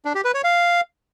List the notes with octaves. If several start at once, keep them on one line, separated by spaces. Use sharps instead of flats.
D4
G4
B4
C#5
F5